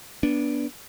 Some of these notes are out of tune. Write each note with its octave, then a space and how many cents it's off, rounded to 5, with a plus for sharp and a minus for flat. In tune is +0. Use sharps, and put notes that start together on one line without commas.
B3 -20 D4 -10